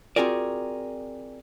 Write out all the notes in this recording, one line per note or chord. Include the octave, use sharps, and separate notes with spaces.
C4 F4 F#4 G#4 A#4 D5